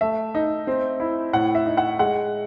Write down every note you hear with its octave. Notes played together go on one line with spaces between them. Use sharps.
A3 E5
D#4
C4
E4
A2 F#5
E5
D#4
F#5
G#3 F#5